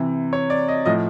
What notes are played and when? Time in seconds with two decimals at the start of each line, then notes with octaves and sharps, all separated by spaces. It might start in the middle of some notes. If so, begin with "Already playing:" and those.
Already playing: C3 E3
0.33 C#5
0.50 D5
0.68 D#5
0.86 A2 F3 D#5